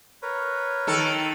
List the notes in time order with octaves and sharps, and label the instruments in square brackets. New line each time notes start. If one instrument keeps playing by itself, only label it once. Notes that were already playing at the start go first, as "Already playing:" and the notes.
[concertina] A#4 B4 C#5
[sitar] D#3 A4